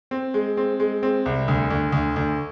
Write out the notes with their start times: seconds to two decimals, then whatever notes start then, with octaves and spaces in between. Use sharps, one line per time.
0.11 C4
0.34 G#3
0.57 C4
0.80 G#3
1.03 C4
1.26 C2
1.48 D2
1.70 D2
1.92 D2
2.16 D2